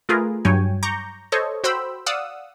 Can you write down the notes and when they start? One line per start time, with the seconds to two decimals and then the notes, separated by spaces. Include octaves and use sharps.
0.09 A3 F4 G#4 A#4 B4
0.45 G2 F#3 C#5 G5 G#5
0.83 A#5 C#6 D6 G6
1.32 A4 C5 C#5 D#5 C#6
1.64 F#4 C5 G5 B5 E6
2.06 D5 F5 F#5 D#6 E6